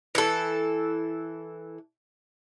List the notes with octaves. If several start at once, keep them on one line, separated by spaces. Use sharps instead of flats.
E3 A4